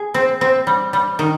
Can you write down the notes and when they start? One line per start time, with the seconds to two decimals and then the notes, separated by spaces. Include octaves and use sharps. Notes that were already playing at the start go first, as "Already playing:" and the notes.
Already playing: G#4
0.14 C4
0.41 C4
0.67 G3
0.93 G3
1.19 D#3